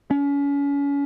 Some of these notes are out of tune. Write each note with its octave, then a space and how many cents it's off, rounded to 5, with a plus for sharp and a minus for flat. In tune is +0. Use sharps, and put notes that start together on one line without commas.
C#4 +35